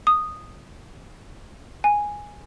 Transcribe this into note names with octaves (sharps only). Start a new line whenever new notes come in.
D#6
G#5